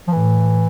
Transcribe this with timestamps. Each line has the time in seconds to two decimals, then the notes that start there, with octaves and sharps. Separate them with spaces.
0.08 F3
0.13 A2 E3